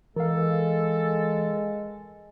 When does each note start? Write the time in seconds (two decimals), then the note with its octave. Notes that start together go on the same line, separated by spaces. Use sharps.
0.16 E3 G#3 A4 A#4 F5